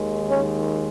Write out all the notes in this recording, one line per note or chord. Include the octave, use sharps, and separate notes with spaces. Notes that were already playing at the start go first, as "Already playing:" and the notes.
Already playing: D#2 D#3 G#3
C#4